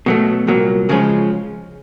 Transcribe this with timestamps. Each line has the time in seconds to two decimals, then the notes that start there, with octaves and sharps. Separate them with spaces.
0.06 B2 F#3 A3
0.47 C2 A#2 F#3 A#3
0.89 C#2 C#3 F3 G#3 C#4